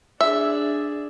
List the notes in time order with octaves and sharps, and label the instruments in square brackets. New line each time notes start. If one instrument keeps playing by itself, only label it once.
[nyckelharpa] D4 G#4 [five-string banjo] E5